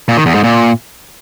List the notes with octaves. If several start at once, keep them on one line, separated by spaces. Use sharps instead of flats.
A#2
D#3
E2
G#2
A#2